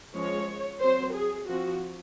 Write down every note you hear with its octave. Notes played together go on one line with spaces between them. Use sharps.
F3 G#3 C#4 C#5
F#3 C4 C5
G#4
F3 C4 F#4